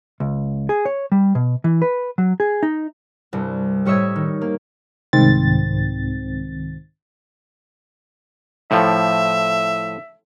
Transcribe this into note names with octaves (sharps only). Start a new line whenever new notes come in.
C#2
G#4
C#5
G3
B2
E3
B4
F#3
G#4
D#4
C2 G2
A2 G3 C#5 D#5 E5 G#6
D#3
A#3
C2 G#2 D#3 C4 A6
A2 F3 E5